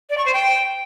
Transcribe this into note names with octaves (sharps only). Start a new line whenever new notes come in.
D5
C#6
C5
G5